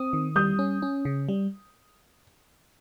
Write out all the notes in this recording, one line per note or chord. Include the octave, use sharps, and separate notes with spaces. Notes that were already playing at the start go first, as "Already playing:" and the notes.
Already playing: C4 D#6
D#3
G3 D#6 G6
C#4
C#4
C#3
G3